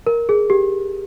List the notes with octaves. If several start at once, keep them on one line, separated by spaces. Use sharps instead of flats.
A#4
G#4
G4